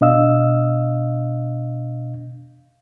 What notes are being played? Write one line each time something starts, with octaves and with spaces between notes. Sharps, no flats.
B2 D4 D#5 F5 E6